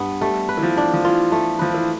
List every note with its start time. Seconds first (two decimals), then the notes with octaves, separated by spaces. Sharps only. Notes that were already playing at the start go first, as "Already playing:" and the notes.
Already playing: G2 B3
0.21 G3 A3
0.49 B4
0.57 E3
0.63 F3
0.77 D4
0.93 F3
1.05 E3 F4
1.32 A3
1.59 F3 B4
1.74 E3